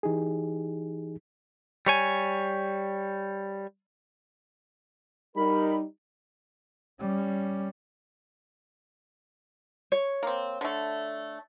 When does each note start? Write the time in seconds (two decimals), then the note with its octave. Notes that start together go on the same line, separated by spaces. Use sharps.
0.03 E3 D#4 G4 G#4
1.87 G3 C#5 G#5
5.36 G3 D#4 A#4 B5
7.00 G3 C#4
9.92 C#5
10.23 A#3 C4
10.61 D3 A3